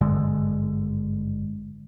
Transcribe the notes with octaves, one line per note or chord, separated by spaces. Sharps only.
G#1 G2 D3 G#3